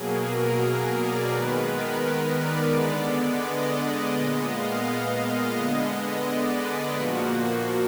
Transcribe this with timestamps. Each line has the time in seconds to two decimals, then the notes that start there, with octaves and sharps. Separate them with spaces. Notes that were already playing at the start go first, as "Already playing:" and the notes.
Already playing: B2 F#3 A#3 G#4
0.29 A#4
0.99 D5
1.33 D#3 G#3 B3 B4
1.69 A#4
2.39 D5
2.75 D3 G#3 B3
3.45 D#5
4.15 A#2 G#3 B3 D#5
4.50 F5
5.21 D#5
5.56 D3 G#3 B3
6.26 D5
6.61 B4
6.96 A#2 F3 A#3 F#4